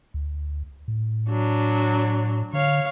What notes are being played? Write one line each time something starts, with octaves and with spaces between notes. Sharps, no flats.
D2
A2
F#3 D4
D3 C#5 F5